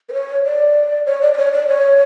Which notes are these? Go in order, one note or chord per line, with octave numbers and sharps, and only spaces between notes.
B4
C#5
D5
C#5
D5
D5
C#5
D5
C#5